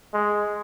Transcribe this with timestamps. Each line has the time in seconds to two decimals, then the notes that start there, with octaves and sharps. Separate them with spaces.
0.14 G#3